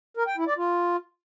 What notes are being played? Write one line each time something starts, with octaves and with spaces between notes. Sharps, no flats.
A#4
G5
E4
D5
F4